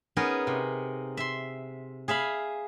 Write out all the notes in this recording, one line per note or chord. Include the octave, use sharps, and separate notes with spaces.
B3 C#4 D#4 G#4 A#4
C3
E5 C6
G#4 E5 F5 B5